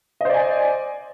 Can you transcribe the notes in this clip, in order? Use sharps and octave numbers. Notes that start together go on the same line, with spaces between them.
C5 D5 D#5 G#5